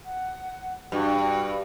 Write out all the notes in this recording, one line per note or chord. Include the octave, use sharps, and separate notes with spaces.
F#5
G2 F#4